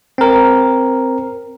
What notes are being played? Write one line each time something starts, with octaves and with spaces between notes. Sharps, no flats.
C4 A#4